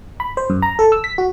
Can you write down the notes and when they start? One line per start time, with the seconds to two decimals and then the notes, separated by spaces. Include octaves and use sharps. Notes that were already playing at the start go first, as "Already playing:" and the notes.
0.20 B5
0.37 C5
0.50 F#2
0.62 A#5
0.79 A4
0.92 E6
1.04 B6
1.18 F#4